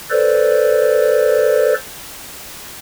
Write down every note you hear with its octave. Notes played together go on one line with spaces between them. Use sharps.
A4 B4 C5 D5